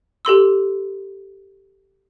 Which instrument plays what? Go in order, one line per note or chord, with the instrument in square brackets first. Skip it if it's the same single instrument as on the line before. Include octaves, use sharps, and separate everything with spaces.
[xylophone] G4 A4 C6 E6